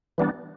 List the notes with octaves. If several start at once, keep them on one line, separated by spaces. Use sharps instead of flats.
E3 G3 B3 D4